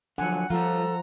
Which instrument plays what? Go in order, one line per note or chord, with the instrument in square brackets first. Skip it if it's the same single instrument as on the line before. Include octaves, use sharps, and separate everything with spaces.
[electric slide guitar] D3 F3 F#3 [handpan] F#5 [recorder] G#5
[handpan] F3 [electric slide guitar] G3 F4 [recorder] A4 [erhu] A#5